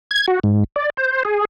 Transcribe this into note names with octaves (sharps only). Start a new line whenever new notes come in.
G#6
F#4
G#2
D5
C5
G#4